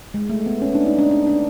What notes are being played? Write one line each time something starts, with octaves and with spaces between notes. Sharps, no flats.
G#3
A3
B3
C#4
D4
D#4
D4
D4
D4